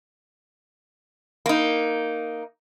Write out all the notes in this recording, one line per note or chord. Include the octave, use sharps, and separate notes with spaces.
A#3 D#4